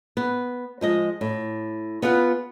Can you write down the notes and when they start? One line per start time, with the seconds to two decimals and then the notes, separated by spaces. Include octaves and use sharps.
0.17 B3
0.81 F3 G#3 D#5
1.21 A2
2.02 B3 F4 G#4 B4 F#5